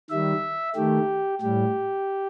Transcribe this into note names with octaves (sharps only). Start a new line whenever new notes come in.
D#3 G3 E5
D#3 A3 G4
A2 G3 G4